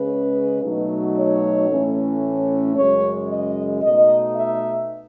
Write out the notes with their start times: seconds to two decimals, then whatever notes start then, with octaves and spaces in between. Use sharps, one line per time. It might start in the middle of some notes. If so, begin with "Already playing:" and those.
Already playing: C#3 G#3 C#4 B4
0.62 B2 F#3 A3 D#4
1.16 C#5
1.69 A2 E3 A3 C#4
2.22 C#5
2.76 F#2 C#3 G#3 C#5
3.29 D#5
3.82 B2 A3 D#4 D#5
4.35 E5